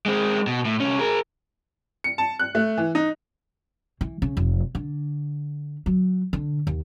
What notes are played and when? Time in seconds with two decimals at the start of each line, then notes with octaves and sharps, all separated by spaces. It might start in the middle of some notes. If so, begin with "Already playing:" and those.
0.06 G#3 C4
0.47 B2
0.65 A2
0.80 C2 C#4
0.99 G#4 A#4
2.04 C#7
2.18 A5
2.39 F#6
2.55 A3
2.77 E3
2.95 D#4
4.01 E3
4.22 C#3
4.37 F1
4.75 D3
5.86 F#3
6.33 D3
6.67 D#2